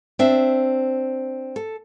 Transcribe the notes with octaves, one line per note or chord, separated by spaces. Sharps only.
C4 D4 E5
A4